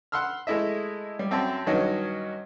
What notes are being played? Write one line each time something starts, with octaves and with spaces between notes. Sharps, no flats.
F#5 B5 C6 E6 F6
G#3 A3 E4 D#5 E5
G3
F#2 C4 E5 G5 A5 E6
G2 D#3 F#3 C#4 D#5